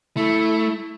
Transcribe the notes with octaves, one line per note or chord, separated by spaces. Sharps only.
A3 E4